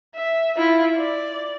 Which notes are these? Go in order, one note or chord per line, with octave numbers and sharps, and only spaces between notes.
E5
E4 F4
D5